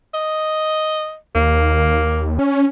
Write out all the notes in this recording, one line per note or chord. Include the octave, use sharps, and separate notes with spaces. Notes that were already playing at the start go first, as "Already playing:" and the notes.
D#5
D#2 A#3
C#4